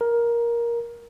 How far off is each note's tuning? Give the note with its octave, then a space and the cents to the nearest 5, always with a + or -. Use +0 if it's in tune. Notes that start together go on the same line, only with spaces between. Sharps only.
A#4 +10